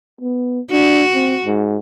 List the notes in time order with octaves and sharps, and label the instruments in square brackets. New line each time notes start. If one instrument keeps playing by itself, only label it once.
[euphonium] B3
[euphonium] D4 [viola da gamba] F#4
[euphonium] C4
G#2